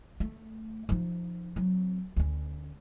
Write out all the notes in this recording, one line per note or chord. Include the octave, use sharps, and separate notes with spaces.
A3
F3 D#4
F#3 C4
D2 C#4